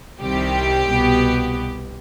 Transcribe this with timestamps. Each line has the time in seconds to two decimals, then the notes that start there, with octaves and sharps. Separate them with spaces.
0.20 C2 C3 D#3 G3 C4 G4
0.89 C2 B2 B3